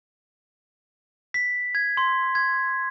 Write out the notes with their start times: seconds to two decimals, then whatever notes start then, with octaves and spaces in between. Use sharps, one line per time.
1.34 B6
1.75 G#6
1.97 C6
2.35 G#6